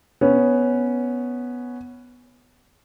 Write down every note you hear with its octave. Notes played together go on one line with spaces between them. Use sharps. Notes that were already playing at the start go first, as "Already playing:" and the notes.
B3 C#4